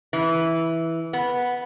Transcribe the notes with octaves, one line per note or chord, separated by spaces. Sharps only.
E3
B3